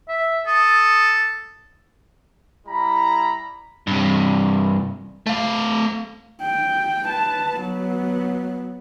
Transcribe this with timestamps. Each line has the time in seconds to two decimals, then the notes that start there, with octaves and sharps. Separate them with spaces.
0.08 E5
0.47 A4 D#6
2.66 G3 E4 A#5 B5
3.87 G2 C3
5.27 A3 F5
6.41 G5
7.06 B4 A5
7.61 F#3 B3